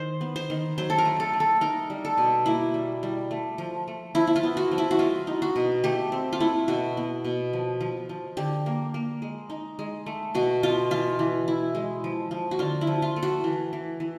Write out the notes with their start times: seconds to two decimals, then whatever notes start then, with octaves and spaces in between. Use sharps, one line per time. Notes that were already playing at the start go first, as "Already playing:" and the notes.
Already playing: D#3 C5
0.21 B3
0.36 C5
0.50 D#3
0.78 F#3 C5
0.90 A4
0.98 A#4
1.05 A3
1.20 A4
1.33 A3
1.40 A4
1.61 D#4 A#4
1.90 G3
2.05 A4
2.17 B2
2.46 A#3 E4
2.74 G3
3.03 G3
3.31 A3
3.58 F3
3.88 A3
4.15 F3 E4
4.27 E4
4.36 F4
4.43 B3
4.57 F#4
4.72 F3
4.78 E4
4.91 F#4
4.99 G#3 F4
5.27 D#4
5.42 F#4
5.56 B2
5.84 A3 G4
6.12 C4
6.33 F4
6.40 A3 E4
6.68 B2 F#4
6.97 B3
7.24 B2
7.53 F3
7.80 F3
8.09 F3
8.37 D3 G4
8.66 A#3
8.94 A#3
9.22 G#3
9.50 D#4
9.79 G#3
10.06 A3
10.35 B2 F#4
10.63 B2 F4
10.91 E3 F4
11.19 E3
11.48 E4
11.75 G#3
12.04 F3
12.31 F3
12.51 F#4
12.59 D3 F4
12.81 E4
12.87 F3
13.02 F4
13.16 A3
13.23 F#4
13.44 E3
13.73 E3
14.00 E3